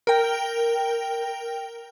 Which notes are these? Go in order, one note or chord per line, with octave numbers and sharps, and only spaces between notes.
A#4 G5